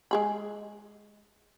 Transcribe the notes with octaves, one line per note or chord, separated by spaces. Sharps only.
G#3 G#4 B5